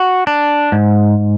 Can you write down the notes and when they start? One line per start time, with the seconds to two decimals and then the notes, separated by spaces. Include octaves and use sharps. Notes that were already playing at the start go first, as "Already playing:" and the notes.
Already playing: F#4
0.27 D4
0.72 G#2